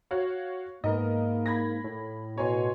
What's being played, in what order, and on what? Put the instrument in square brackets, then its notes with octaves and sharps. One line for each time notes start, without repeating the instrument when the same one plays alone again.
[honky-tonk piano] F#4 C#5 F5
[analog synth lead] G#2 [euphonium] A#3 [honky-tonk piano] B3 A#4 D#5
[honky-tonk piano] B5 G#6 A#6
[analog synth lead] A2
[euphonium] B2 [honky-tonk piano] C#5 G#5 C6